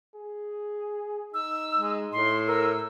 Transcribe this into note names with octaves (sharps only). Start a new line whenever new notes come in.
G#4
D#4 E6
G#3
A2 C6
A#4 E6